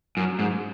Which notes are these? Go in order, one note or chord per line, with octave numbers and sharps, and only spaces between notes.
F#2
G#2